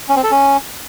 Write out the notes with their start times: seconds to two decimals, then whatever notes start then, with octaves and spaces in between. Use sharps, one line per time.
0.09 C#4
0.16 C4
0.24 A4
0.31 C#4